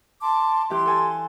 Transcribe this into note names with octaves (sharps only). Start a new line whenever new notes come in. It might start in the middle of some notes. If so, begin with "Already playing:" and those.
A5 C6 D6
E3 E4 G4 C6
A4 G#5 A5